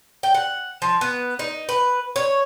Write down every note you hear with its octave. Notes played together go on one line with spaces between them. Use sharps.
G5
F#5
F3
B3
D#4
B4
C#5